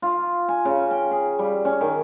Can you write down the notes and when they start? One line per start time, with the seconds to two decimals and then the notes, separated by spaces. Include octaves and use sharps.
0.02 F4
0.48 G#5
0.65 C#3
0.91 G5
1.11 G#4
1.39 G3
1.65 C#4
1.81 D#3